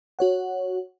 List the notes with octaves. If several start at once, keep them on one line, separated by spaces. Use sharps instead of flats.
F#4 C#5 F#5